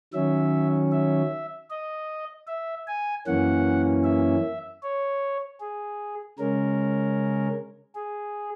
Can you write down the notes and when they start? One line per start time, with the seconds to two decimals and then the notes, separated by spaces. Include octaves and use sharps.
0.13 D#3 F#3 C#4 E5
0.92 E5
1.70 D#5
2.47 E5
2.88 G#5
3.27 F#2 E3 A#3 C#4 F#5
4.04 E5
4.83 C#5
5.60 G#4
6.38 C#3 G#3 C#4 A#4
7.95 G#4